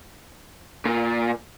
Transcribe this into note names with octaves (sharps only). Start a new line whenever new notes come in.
A#2